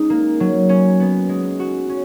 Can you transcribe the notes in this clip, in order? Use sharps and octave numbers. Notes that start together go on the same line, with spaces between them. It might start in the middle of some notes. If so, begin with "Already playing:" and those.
Already playing: G#3 C#4 D#4
A#3
F#3
C#4
B3
G#3
F#4
C#4